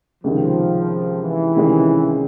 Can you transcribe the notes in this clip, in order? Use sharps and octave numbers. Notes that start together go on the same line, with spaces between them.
C#2 C3 D#3 F3
E3
C#2 C3 D#3 G#3 C#4